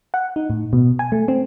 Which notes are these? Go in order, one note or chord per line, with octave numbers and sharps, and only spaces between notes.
F#5
D#4
A2
B2
G#5
A3
C4